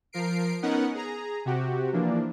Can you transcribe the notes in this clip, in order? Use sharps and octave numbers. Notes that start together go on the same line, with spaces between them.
F3 A#4 C7 D7
B3 C#4 D#4 A#4 F#5
G#4 A#5
C3 F#4 G4
E3 F3 A#3 D4